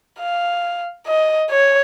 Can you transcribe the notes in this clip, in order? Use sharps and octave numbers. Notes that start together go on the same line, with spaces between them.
F5
D#5
C#5